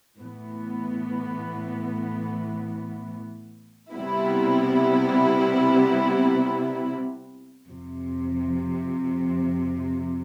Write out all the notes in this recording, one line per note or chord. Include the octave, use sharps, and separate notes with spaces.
A2 E3 B3
C3 G3 B3 E4
F2 C3 F3